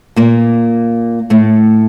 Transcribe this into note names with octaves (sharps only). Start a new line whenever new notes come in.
A#2 A#3
A2 A3